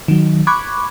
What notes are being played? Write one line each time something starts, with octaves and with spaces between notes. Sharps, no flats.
D#3 F#3
B5 C#6 D6 F#6 G#6